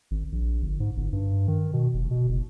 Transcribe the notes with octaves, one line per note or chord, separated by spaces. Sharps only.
G#1
A#1
G1
G#2
G1
G2
D#3
B2
F1
B2
F#1